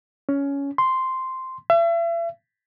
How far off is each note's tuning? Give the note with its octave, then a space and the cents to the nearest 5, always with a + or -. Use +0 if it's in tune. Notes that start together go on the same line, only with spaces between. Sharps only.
C#4 +15
C6 -5
E5 +40